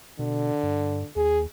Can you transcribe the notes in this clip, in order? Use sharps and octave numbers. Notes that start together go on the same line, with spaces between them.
B2 D3
G2
D#2 G#4